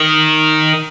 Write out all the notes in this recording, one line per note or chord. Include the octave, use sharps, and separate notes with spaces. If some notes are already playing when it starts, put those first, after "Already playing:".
Already playing: D#3